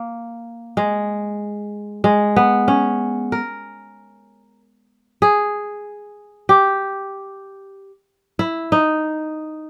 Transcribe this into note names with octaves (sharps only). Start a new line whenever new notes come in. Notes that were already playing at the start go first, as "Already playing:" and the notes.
Already playing: A#3
G#3
G#3
B3
C#4
A#4
G#4
G4
E4
D#4